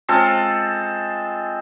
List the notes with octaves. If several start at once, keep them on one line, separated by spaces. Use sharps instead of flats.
G#3 C4 F4 A4